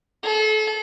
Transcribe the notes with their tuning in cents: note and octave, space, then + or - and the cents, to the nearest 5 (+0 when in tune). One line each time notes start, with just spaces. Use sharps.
A4 -35